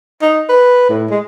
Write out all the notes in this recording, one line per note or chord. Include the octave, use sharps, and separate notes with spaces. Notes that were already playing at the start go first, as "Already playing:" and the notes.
D#4
B4
A2
G#3